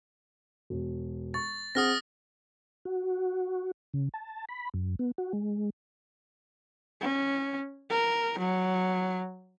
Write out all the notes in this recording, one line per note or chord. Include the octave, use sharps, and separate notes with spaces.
E1
C#6 A6
C4 G#4 F#5 D#6 F6 A#6
F#4
C#3
A5
B5
F#2
B3
F#4
G#3
C#4
A#4
F#3